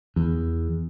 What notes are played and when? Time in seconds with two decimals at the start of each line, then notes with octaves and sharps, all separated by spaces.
0.16 E2